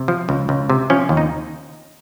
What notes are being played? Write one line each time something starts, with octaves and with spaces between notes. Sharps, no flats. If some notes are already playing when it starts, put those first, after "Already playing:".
Already playing: C3
F3
C#2
C#2
C3
F3 C#4
D#2
D#4